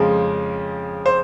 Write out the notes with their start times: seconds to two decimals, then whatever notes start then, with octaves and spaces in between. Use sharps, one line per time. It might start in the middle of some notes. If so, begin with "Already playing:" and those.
Already playing: F2 C#3 F3 G#3
1.06 C5